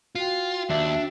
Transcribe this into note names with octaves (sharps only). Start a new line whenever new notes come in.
F4 F#4 G5
D#2 D4 E5